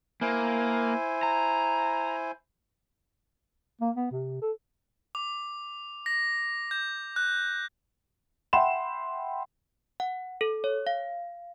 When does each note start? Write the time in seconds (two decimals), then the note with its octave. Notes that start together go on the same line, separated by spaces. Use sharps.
0.21 A#3 E4 C5 G#5
1.23 A#5
3.81 A#3
3.96 B3
4.11 C3
4.42 A4
5.15 D6
6.06 A#6
6.71 G6
7.16 F#6
8.53 E5 F#5 G5 B5 C6 E7
10.00 F#5
10.41 A4
10.64 C#5
10.87 F5